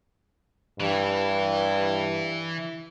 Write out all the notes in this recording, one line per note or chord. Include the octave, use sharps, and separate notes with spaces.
G2 E3